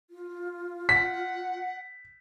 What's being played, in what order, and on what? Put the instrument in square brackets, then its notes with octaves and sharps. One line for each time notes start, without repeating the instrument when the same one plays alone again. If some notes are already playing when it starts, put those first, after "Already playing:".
[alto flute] F4
[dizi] F#5 [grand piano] B6